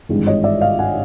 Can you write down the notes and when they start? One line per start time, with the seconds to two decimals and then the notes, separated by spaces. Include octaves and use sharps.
0.09 G#1 G2 E3 G#3
0.27 C#5 D#5
0.44 D5 E5
0.61 D#5 F5
0.79 F#5 G#5